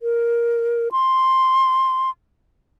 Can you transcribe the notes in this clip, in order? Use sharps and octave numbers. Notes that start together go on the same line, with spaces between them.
A#4
C6